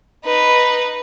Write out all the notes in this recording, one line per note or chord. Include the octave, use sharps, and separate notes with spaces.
D#4 B4